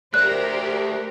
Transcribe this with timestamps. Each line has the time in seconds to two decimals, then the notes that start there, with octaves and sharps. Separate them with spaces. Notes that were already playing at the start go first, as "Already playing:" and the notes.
0.14 A3 G4 A#4 C5 D5 F#6